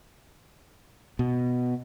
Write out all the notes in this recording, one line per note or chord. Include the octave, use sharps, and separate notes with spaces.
B2